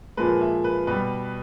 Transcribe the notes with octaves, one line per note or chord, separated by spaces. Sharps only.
A#2 F3 G#3 B4
E5
B4
B2 G3 B4